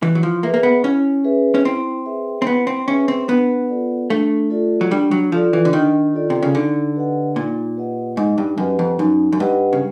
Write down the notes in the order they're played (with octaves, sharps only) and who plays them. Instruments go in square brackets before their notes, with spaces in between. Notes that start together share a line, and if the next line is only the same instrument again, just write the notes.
[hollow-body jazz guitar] E3 [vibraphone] E4
[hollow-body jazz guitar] F#3
F3
[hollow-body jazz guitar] A#3 [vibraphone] G#4 B4 E5
[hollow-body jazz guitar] A#3
B3
[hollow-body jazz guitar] C#4 [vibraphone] E4
[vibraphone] G#4 B4 E5
[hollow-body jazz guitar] C#4
[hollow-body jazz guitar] C4 [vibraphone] E4
[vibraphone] G#4 B4 E5
[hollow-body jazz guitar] C4
[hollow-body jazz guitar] B3 [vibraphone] E4
[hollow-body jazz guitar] C4
[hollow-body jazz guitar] C#4 [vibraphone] G#4 B4 E5
[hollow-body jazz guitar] C4
[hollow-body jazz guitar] B3 [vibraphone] D4
[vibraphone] F4 A4 D5
[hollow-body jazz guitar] A3 [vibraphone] D4
[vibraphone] F4 A4 D5
[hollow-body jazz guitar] F#3
[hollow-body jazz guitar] G3 [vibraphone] D4
[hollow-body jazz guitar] F#3
[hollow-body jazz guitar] F3 [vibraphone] F4 A4 D5
[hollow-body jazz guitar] E3
D3
[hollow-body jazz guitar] D#3 [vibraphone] D4
[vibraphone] F4 A4 D5
[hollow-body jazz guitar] C3
C#3
[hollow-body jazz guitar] D3 [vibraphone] D#4
[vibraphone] G4 B4 D#5 F#5
[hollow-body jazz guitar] A#2 [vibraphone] D#4
[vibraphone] G4 B4 D#5 F#5
[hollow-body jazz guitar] G#2 [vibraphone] D#4
[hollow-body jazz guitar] G2
[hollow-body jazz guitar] F#2 [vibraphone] G4 B4 D#5 F#5
[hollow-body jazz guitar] F2
[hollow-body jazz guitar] F#2 [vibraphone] D#4
[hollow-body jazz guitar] F#2
[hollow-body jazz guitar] G2 [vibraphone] G4 B4 D#5 F#5
[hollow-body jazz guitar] C#3